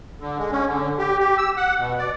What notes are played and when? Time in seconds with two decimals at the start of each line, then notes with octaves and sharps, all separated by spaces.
0.20 D3
0.38 G#3
0.52 C#4
0.67 D3
0.98 G4
1.20 G4
1.38 E6
1.57 F#5
1.79 B2
1.99 D5